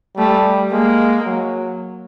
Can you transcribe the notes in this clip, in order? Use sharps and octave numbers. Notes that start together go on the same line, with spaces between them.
G3 A3
G#3 A#3
F#3